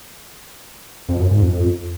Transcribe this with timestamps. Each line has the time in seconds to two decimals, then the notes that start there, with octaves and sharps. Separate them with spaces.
1.09 F2
1.20 F#2
1.31 G#2
1.42 F2